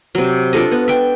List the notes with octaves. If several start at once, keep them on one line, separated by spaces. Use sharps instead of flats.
C3 F#3
D4 F4 A4 D#5
B3
E5 G5